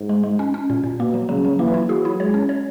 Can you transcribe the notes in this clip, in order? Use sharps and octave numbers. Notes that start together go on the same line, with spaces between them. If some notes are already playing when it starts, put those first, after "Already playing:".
Already playing: G#2
G#3
G#3
C#4
C#4
A#2
A#2
B2 A#3
F#3
C#3 F#3
F#3
E3 A#3
E4
F#3 G#4
E4
G#3 C#5
C#4
C#5